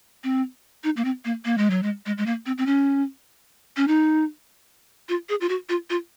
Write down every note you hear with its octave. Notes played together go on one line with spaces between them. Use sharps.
C4
D#4
A#3
C4
A#3
A#3
G#3
F#3
G#3
G#3
G#3
A#3
C4
C4
C#4
C#4
D#4
F4
G#4
F4
F#4
F4
F4